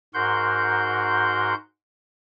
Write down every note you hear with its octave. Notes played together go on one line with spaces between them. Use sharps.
G#2 F#4 A#4 F#5 C6 G6